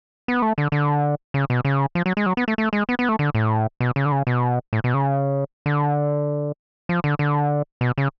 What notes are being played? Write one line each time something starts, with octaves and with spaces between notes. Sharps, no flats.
B3
A3
D3
D3
C#3
B2
C#3
F3
F#3
G#3
F#3
B3
A3
A3
G#3
B3
B3
A3
D3
A2
B2
C#3
D3
C#3
B2
A2
B2
C#3
D3
F3
D3
D3
B2
C#3